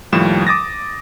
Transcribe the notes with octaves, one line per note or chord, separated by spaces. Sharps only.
D#2 A2 F3 G3 E7
D6 D#6 A6 A#6